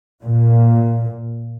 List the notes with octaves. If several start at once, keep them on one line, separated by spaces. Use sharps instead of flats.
A#2